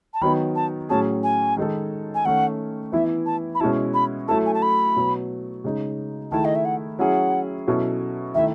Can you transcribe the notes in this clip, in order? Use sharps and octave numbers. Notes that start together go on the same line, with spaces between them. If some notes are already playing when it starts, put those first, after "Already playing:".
A5
D#3 F#3 B3 D#4 B5
A5
A2 F#3 C#4 G#4 A5
G#5
D#3 G#3 D#4 A4
G#5
D#3 A3 C#4 F#5
E3 B3 E4 E5
A5
B5
B2 G#3 C#4 E4 A5
B5
F#3 A3 E4 A4 A5
G#5
A5
B5
B2 F#3 B3
C#3 G#3 D#4
D#3 A3 E4 G#4 A5
D#5
E5
F#5
F#3 C#4 E4 G#4 F#5
B2 F#3 C#4 E4 A4
D#3 A3 E4 E5